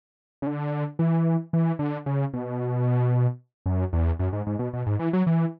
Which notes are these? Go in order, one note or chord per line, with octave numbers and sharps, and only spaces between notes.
C#3
D3
E3
E3
D3
C#3
B2
F#2
E2
F#2
G#2
G#2
B2
B2
G#2
E3
F#3
E3